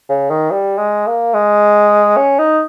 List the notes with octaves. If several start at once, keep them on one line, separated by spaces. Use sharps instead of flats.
C#3
D#3
G3
G#3
A#3
G#3
C#4
D#4